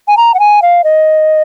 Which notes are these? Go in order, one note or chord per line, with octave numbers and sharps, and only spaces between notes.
G#5
A#5
F#5
G#5
F5
D#5